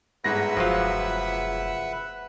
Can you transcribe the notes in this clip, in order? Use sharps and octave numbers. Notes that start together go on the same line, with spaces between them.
G1 G#2 B4 E5 F#5 A#6
F1 F3 F#3 F4